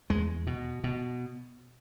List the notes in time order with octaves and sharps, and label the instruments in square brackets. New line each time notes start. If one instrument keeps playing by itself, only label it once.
[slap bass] E2 G#3
B2
B2